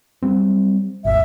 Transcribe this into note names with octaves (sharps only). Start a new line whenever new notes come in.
F#3 G3 C4
D#1 G#1 E5